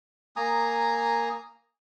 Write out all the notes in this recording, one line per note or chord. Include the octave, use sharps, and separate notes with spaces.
A#3 G#5 A#5 D#6